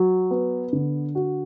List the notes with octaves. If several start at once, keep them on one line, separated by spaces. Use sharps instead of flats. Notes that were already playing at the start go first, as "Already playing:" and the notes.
Already playing: F#3
B3
D3
F#4